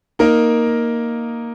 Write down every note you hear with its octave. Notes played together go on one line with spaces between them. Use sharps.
A#3 D#4 A#4